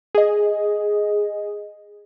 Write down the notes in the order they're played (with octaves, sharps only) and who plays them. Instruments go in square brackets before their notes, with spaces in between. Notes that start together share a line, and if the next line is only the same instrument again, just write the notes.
[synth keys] G#4 D#5